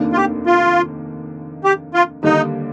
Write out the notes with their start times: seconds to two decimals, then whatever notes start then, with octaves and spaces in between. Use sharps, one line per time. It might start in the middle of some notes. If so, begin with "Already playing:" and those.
Already playing: F1 D#2 D#3 A#3 D4
0.13 F4
0.16 G4
0.46 F4
1.64 G4
1.94 F4
2.23 D#2 D3 G3 A#3 D4 D#4